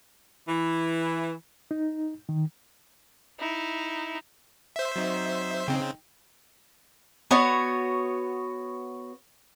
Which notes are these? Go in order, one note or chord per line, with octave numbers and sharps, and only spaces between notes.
E3
D#4
D#3
D#4 E4
C5 E5
F#3 C4 D#4
C#3 C4 D#4 G5
B3 F#4 C#5